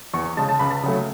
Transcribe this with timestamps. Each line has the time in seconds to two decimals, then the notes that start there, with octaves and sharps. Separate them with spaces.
0.14 E2 C#6
0.25 C#6
0.37 C#3 G#3 A5
0.49 A5
0.59 C#2 B5
0.70 A5
0.83 C#3 F#3 A3